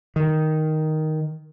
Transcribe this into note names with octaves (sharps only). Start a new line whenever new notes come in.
D#3